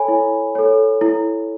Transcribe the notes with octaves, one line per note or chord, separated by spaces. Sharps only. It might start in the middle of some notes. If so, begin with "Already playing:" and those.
Already playing: A4 C#5 G#5 B5
E4
A4 C#5
E4